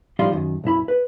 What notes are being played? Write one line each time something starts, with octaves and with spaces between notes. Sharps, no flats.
A2 F3 G3 D#4 F4
F#2 D#3
B1 F#2 E4 B5
B4